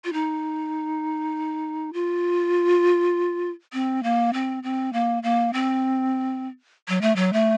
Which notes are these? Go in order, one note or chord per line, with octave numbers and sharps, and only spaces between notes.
F4
D#4
F4
C4
A#3
C4
C4
A#3
A#3
C4
F#3
A3
F#3
A3